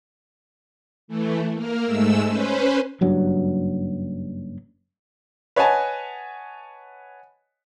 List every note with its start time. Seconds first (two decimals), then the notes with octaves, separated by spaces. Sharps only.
1.08 E3 A3
1.54 A#3 A#4
1.84 G#2 G#3 A3 E6
2.25 C#4 B4 C5
3.01 F#1 G2 F#3
5.56 B4 C#5 D#5 F#5 G#5 A5